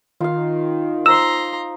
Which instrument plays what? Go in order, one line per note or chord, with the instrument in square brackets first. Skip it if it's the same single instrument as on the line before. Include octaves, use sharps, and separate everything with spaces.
[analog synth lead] D#3 [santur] F4 F5
[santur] D#4 C5 [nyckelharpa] A#5 C6 [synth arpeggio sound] E6